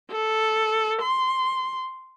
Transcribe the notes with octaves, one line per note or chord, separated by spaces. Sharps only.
A4
C6